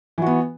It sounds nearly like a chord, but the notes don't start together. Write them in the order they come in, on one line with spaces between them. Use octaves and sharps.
E3 F#4 B3